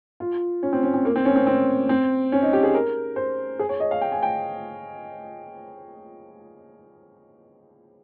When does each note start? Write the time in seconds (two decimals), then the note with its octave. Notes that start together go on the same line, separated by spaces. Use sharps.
0.20 F4
0.63 C#4
0.73 C4
0.83 C#4
0.94 C4
1.05 A#3
1.16 C4
1.25 C#4
1.36 C4
1.47 C4
1.89 C4
2.32 C#4
2.42 D#4
2.53 G4
2.63 G#4
2.74 A#4
3.16 C5
3.59 G#4
3.69 C#5
3.80 D#5
3.91 F5
4.01 G5
4.12 G#5
4.23 G5